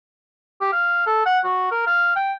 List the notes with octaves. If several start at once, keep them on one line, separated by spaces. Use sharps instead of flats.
G4
F5
A4
F#5
F#4
A#4
F5
G5